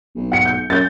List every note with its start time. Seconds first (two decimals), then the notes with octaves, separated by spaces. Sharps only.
0.15 B1
0.32 F#5 C#7
0.45 G6
0.70 F#2 G6 A6